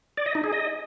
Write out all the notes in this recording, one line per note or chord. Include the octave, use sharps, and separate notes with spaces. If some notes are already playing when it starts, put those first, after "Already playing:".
D5
D#5
D#4
G#4
D#5